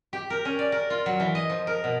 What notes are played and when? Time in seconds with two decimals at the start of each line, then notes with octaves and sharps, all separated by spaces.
0.13 G4
0.30 A#4
0.45 C#4
0.59 D5
0.72 A#4
0.90 F4
1.06 F#3
1.20 E3
1.35 D#5
1.50 F3
1.67 A#4
1.84 B2